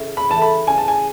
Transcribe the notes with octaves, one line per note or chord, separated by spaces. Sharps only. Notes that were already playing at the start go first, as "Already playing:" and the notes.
Already playing: C#3 E3 A3
B5
E3 A3 A5
B5
C#3 G#5
A5
G#5